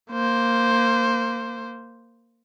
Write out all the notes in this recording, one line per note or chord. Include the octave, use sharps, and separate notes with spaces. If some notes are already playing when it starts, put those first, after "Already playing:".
A#3 C5